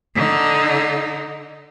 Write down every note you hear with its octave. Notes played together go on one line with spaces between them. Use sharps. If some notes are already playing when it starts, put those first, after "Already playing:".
D3 D#4